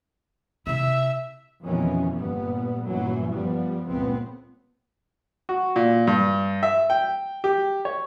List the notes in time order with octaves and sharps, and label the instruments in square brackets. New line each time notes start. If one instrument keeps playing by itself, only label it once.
[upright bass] C3 E4 [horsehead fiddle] E5
[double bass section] F2 B2 D#3 E3 C#4
G1 G2 A#2 G3 B3
G1 F#2 A#2 E3 F#3
F3 G3 B3
G1 C#2 A#2 B3 C4
[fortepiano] F#4
A#2
G2
E5
G5
G4
C#5